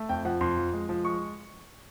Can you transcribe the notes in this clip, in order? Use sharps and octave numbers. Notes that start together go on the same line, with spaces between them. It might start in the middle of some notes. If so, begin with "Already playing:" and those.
Already playing: A3
F2 G5
F3 F#5
F2 C6
F3
G#3
F3
G#3 C#6